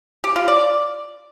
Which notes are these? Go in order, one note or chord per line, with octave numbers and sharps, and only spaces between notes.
G4
F4
D5